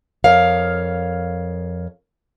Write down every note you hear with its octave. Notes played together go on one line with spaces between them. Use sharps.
F2 A#4 C#5 F5